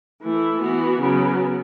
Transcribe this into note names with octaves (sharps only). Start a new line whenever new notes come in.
E3 A3 E4
E3 B3 F#4
C#3 F#3 B3